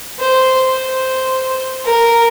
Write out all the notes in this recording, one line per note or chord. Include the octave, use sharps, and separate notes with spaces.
C5
C5
A#4